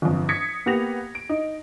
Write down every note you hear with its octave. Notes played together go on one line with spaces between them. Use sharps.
G1 F2
D#6 G#6 A#6 B6 C#7
A#3 B3 G4 A#6 F7
D7
D#4